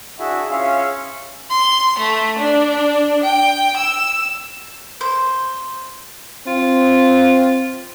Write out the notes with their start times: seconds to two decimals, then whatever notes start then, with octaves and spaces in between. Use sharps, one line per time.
0.19 D4 E4 F#4 G#4 E5
0.49 C#4 F4 G#4 E5 F5
1.50 C6
1.98 A3
2.39 D4
3.24 G5
3.77 E6
5.01 C5
6.47 C4 F4